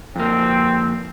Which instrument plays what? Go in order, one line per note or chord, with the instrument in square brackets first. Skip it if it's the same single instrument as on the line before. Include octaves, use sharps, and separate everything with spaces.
[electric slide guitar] F2 A#3 [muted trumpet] C4